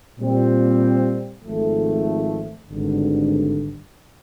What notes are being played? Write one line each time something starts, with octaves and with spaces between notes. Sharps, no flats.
A#2 G3 C4
G#1 G#2 F3 A3
G#1 G2 D3